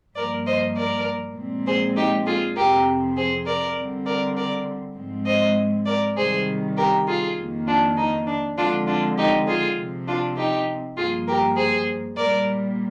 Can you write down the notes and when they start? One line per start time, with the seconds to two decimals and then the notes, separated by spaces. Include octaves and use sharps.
0.16 G2 F3 A#3 A#4 D5
0.46 C5 D#5
0.76 A#4 D5
1.36 A#2 F3 G#3 C4
1.66 G#4 C5
1.96 D#4 G4
2.26 F4 G#4
2.56 F2 C3 F3 C4 G4 A#4
3.17 G#4 C5
3.46 A#4 D5
3.77 D3 G3 C4
4.06 A#4 D5
4.36 A#4 D5
4.96 G#2 F3 G#3 C4
5.26 C5 D#5
5.86 A#4 D5
6.16 C3 D#3 G3 G#4 C5
6.77 G4 A#4
7.07 F4 G#4
7.37 F2 D#3 A#3
7.67 D4 F4
7.97 D#4
8.26 D4
8.57 D3 F3 G#3 C4 D4 F4
8.87 D4 F4
9.17 D#4 G4
9.47 F4 G#4
9.78 C3 F3 C4
10.07 D4 F4
10.37 D#4 G4
10.97 G2 F3 A#3 F4 G#4
11.27 G4 A#4
11.57 G#4 C5
12.17 A#2 G3 A#3 A#4 D5